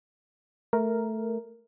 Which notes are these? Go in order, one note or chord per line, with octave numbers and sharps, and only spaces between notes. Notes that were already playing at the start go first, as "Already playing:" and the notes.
A3 A#4